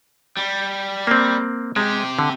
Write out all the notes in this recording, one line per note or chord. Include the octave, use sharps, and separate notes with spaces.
G3
A#3 C4
C3 G#3 G4
D3